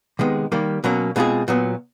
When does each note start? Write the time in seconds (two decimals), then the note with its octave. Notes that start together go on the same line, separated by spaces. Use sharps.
0.19 C3 D#3 G#3 B3
0.52 D#3 G3 A#3
0.84 B2 F#3 A#3 C#4
1.16 B2 G#3 C4 F4 G#4
1.48 A#2 F#3 B3